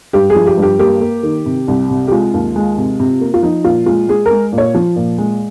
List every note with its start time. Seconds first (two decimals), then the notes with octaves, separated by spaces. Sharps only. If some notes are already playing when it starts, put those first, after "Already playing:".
0.13 G2 G4
0.30 G#4
0.35 F3
0.47 G4
0.57 G2
0.63 G4
0.79 A#3 G4
1.01 A#3
1.23 D#3
1.46 C3
1.68 C2
1.90 C3
2.08 G4
2.11 G#3 F4
2.34 D#2
2.56 G#3
2.78 C3
3.00 C3
3.21 A#3
3.34 F4
3.43 F3 D#4
3.64 A#2 F4
3.86 G#3 F4
4.08 G#3 G#4
4.26 G#3 A#4
4.52 A#2
4.58 C#5
4.74 F3
4.96 A#2
5.18 G#3